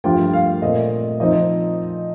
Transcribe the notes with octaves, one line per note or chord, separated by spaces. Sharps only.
G2 F3 A3 D4 F4 G5
F5
A#2 A3 C4 D#5
F3 C4 D#4 D#5